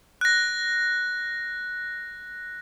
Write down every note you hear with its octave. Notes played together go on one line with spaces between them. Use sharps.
F#6 A#6